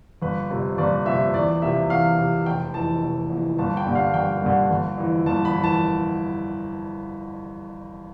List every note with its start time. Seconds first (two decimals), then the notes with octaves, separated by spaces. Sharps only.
0.22 G1 B4
0.50 F2 C3 F3
0.78 G1 D5
1.06 F2 C3 F3 E5
1.34 E2 D5
1.62 C3 F3 E5
1.90 E2 F5
2.18 C3 F3
2.46 F1 G5
2.74 F2 E3 A5
3.02 F1
3.30 F2 E3
3.58 G1 A5
3.77 G5
3.87 G2 D3
3.95 F5
4.14 G1 G5
4.43 G2 D3
4.70 G1
4.98 F2 E3
5.26 G1 A5
5.45 B5
5.55 F2 E3
5.64 A5